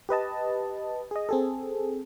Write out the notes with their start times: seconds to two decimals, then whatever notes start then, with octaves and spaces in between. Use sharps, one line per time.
0.09 G4 B4 D#5 A5
1.11 G#4 D#5
1.29 C4 G#4 A4